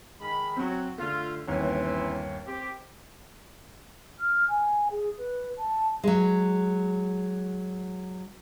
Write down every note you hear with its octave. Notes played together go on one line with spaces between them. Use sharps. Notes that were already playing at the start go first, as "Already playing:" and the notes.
D#3 G#3 B5
F#3 C4 F#4
D3 A3 F4
G1 D#2 E3 C4 C#4
C4 G4
F6
G#5
G#4
B4
A5
F#3 G#3